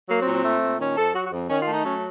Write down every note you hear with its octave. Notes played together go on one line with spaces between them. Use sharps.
F#3 A#3
C4
A#2
C4
A3
A#2
D#3 C#4
F2 A4
F#3 F#4
F#4
F2
D#3 C#4
F4
A3
D#4
F#3 C#4